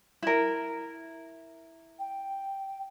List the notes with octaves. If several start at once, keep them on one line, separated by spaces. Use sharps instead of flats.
E4 A#4
G5